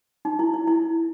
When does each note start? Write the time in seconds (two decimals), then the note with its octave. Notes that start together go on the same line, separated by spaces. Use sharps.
0.25 D#4
0.39 E4
0.54 E4
0.67 E4